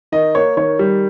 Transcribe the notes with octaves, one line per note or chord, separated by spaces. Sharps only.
D#3 D#5
A#3 C#5
D#3 C#5
G3